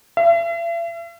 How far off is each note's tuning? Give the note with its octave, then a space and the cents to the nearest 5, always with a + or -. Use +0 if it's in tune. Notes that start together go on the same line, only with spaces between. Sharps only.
E5 +45